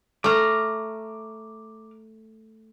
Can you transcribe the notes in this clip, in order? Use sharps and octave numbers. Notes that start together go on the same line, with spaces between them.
A3 A#5 D6 F6